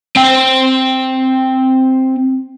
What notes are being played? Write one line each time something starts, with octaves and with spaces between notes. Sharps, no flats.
C4 G5